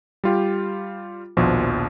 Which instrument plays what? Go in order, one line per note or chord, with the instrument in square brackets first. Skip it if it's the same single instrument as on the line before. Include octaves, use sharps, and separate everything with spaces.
[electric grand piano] G3 F4 G4
A#1 D#2 B2 F3